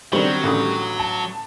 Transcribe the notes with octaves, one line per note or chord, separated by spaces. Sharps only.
D#3 F#3 G3 C4 D4
A1 D3 D#6
A5